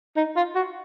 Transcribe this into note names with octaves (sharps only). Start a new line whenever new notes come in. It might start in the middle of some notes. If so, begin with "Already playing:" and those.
D#4
F4
F#4